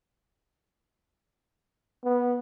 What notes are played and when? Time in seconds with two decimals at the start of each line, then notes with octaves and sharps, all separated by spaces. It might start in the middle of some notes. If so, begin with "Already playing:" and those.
2.05 B3